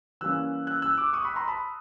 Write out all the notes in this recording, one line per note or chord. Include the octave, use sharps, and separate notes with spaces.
E3 G3 A#3 C#4 E6 F#6
E6 F#6
E6 F#6
D6 E6
C#6 D#6
B5 C#6
A#5 C6
A5 B5